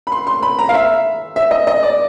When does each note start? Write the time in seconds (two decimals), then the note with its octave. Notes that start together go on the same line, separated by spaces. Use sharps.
0.07 B5
0.12 C6
0.27 C6
0.43 B5
0.59 A#5
0.69 F5
0.74 E5
1.36 E5
1.51 D#5
1.67 D#5
1.83 D5